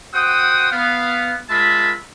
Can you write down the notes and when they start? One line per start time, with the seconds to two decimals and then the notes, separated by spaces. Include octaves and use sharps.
0.15 F#4 C5 F#5 G5 D#6
0.72 B3 F5
1.50 G#3 F4 A#4 E5 A5 B5